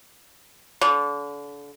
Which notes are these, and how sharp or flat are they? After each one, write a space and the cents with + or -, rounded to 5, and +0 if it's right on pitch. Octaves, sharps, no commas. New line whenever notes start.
D3 -35